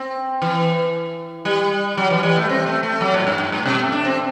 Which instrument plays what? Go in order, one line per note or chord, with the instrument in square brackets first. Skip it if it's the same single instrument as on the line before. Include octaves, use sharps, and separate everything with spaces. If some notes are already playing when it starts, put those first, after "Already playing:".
Already playing: [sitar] C4
E3
G3
F#3
E3
G3
A3
C4
A3
A3
F#3
A2
G2
G2
A2
B2
A3
D4
C4